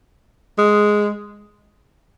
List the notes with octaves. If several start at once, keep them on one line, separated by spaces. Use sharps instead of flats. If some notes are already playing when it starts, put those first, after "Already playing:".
G#3